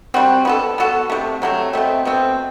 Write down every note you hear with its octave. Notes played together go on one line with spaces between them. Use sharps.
G3 C4 F#4
B3 F#4 A4
B3 F#4 A4
C3 F#3 A3
C3 F#3 A3
B2 A3 C4
B2 A3 C4